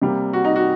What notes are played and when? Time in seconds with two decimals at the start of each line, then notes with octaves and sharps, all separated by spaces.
0.02 C3 G3 A#3
0.33 F#4
0.45 D#4
0.56 F#4